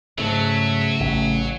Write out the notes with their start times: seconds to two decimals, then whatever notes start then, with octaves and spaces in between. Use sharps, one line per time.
0.18 G#2 C#3 F#3 A3 E5 A5
1.00 A1